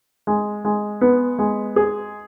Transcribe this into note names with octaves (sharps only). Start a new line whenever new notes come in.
G#3
G#3
B3
G#3
G#4